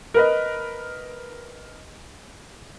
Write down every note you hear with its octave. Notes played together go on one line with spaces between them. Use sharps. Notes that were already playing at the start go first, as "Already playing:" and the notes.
A#4 B4 D#5